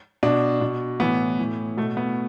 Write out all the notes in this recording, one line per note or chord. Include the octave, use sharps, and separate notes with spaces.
B2 D4
B2
A2 E3 B3
A2 E3
B2 A3
B3